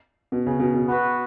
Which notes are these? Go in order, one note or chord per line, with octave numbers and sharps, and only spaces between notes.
B2
C#3
B2
B2
B3 F#4 B4